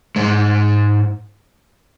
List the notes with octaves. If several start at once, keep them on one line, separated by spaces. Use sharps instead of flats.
G#2 G#3